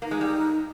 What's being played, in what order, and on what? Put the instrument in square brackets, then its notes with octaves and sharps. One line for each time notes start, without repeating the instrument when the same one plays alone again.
[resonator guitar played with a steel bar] A#3 [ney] D#4
[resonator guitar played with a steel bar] G#3
G3